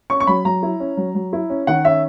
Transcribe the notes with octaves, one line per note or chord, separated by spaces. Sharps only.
C#4 C#6
C#6
F#3 B5
F#3 A#5
E4
C#4
F#3
F#3
E4
C#4
D#3 F#5
C#4 E5